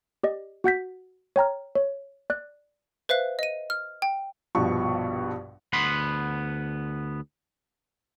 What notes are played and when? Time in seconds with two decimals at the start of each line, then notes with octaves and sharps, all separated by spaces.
0.23 G4 D5 D#5
0.64 F#4 F#5 G6 B6
1.36 C#5 G5 A#5 F6
1.75 C#5
2.30 D5 F#6
3.09 B4 C5 E5 F5 F#6
3.39 D#5 D#7
3.70 F6
4.02 G5
4.55 A#1 G2 B2 F3 C#6
5.73 D2 B3 F#5 B5 C6